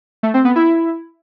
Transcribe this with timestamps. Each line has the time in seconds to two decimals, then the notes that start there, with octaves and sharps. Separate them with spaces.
0.23 A3
0.34 C4
0.45 B3
0.56 E4